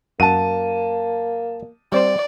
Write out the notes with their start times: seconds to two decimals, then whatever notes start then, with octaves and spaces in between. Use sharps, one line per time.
0.20 F#2 A#3 F#5 A5 D#7
1.92 G3 C4 C5 D5